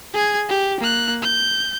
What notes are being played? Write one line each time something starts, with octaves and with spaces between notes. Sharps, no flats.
G#4 G#6
G4
A#3 F#6
G6